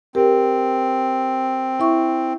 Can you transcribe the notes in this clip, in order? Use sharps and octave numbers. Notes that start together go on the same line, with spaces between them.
C4 G4 A#4
E4 E5 C#6